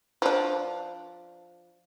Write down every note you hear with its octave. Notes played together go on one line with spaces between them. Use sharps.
F3 D4